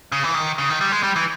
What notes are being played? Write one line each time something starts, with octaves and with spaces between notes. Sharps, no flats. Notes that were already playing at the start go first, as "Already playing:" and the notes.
C#3
E3
D#3
C#3
D#3
G3
G#3
G3
E3